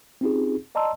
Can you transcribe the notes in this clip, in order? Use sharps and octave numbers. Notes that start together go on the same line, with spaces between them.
C4 C#4 D#4 F4 G4 G#4
D5 D#5 A5 A#5 C6 E6